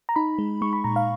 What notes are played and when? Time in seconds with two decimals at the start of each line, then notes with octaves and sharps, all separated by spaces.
0.09 A#5
0.16 D#4 B5
0.39 G#3
0.61 G#3 C#6
0.73 B5
0.84 A#2 A#5
0.96 F5